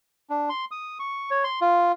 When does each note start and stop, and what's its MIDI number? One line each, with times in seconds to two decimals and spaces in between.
0.30 0.49 62
0.49 0.65 84
0.71 0.98 87
0.99 1.30 85
1.31 1.44 73
1.44 1.60 84
1.61 1.92 65